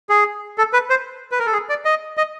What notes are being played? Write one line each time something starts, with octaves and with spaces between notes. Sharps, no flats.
G#4
A4
B4
C5
B4
A#4
A4
G#4
D5
D#5
D#5